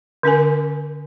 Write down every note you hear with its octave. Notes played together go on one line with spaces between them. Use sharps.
D3 C#4 A#4 G#5